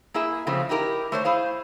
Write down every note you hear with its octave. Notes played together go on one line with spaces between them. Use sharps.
A#3 E4 G#4 E5
C#3 F3 A3 C4
D#4 E4 G4 A#4
A3 C5 C#5
E4 G#4 C5 F5